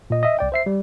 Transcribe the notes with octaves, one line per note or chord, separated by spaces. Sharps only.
A#2 D#5
D#5 E5
C2 D5 G5
C5 E5 C7
G3